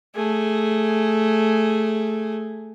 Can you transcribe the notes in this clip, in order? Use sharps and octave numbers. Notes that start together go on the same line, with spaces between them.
A3 G#4